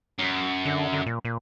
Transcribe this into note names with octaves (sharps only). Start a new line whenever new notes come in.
F#2
D3
D3
A#2
A#2